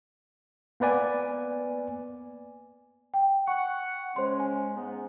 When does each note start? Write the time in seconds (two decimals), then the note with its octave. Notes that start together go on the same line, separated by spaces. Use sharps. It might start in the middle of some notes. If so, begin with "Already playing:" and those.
0.80 A#3 B3 B4 D5 G#5
3.14 G5
3.48 F#5 C#6
4.16 C#3 G#3 C#4 C5 C6
4.40 G#5
4.74 G#2 G#3 B3